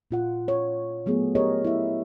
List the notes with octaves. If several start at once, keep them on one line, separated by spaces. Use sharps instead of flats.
A#2 F4 F#5
C#5
F#3 A3 B3 G#4
G4 G#4 A#4 C#5 D#5
E4 E5